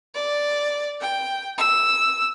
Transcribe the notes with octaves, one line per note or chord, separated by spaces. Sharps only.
D5
G5
E6